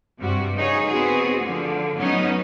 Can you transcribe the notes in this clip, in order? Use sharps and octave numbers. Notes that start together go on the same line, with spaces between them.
G2 C3 G3 F#4
C#3 D#4 F#4 G#4 C#5
B3 C4 F#4 G#4
D3 F3
A2 F#3 B3 C#4 D#4